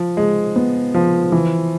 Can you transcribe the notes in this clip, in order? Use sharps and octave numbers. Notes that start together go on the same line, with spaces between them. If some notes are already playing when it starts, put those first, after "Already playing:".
Already playing: F3
G#3
B3
F3
E3